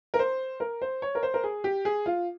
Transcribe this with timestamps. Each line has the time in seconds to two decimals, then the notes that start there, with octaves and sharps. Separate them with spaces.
0.14 A#4
0.19 C5
0.60 A#4
0.82 C5
1.02 C#5
1.15 A#4
1.23 C5
1.34 A#4
1.44 G#4
1.64 G4
1.85 G#4
2.06 F4